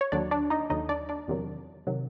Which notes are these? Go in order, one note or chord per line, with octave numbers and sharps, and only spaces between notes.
C#5
D#2 D3 F#3 D4 D5
D4 D5
D#4 D#5
D#2 D3 F#3 D#4 D#5
D4 D5
D4 D5
E2 C3 D#3 F#3
C3 D#3 F#3